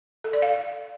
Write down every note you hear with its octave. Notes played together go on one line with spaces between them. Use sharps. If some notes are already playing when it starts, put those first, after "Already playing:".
A4
D5
F5